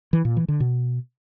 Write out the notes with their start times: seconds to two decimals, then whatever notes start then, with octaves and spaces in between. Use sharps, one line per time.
0.13 E3
0.25 A#2
0.37 E3
0.48 D3
0.60 B2